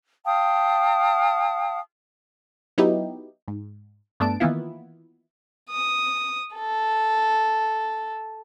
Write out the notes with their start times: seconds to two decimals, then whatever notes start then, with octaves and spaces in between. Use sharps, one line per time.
0.25 F5 G5 A5 D#6
2.78 F#3 B3 D#4 E4 G4
3.48 G#2
4.20 G2 A3 B3 D4 A5 D7
4.40 D#3 E3 A#3 B3 E4 F4
5.70 D#6
6.55 A4